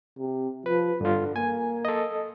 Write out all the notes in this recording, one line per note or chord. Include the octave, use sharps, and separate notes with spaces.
C3
F3 B4
G2 D3 F4
A#3 G#5
A4 D#5